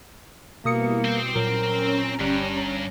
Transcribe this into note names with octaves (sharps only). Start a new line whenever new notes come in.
B2 G3 A#3 B3 E4 D#6 C#7
C4 C5 D6
A#2 F#3 C#4 A#4 A#5
G1 G2 G3